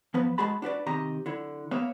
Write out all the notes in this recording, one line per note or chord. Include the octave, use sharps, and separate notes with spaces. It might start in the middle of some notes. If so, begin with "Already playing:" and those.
F3 B3 B4
G#3 A3 F#4 G#4 A5 B5
D4 F#4 B4 D5
C3 D#3 G4 D#5 A#5
D3 E4
A#3 B3 B4 C#5 E5 F5